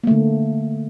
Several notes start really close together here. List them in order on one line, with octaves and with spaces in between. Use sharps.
A#3 A3 D3